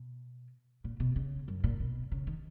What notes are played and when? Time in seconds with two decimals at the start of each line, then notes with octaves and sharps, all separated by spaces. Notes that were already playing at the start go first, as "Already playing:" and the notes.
Already playing: B2
0.84 A#2
1.00 B2
1.16 C#3
1.48 F#2
1.64 A#2
1.80 B2
2.12 C#3
2.27 D#3